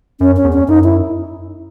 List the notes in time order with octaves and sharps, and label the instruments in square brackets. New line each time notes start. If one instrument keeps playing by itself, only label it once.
[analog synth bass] F#2 [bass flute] C#4
[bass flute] C#4
[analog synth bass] E2
[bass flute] C#4
[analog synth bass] F#2 [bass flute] D#4
[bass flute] E4